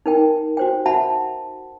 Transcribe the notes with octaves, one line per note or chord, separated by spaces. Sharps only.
D#4 A#4 G5
F#4 C5 G5
F#4 E5 F#5 A5 B5